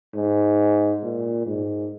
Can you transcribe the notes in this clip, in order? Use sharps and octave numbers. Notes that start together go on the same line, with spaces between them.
G#2
A#2
G#2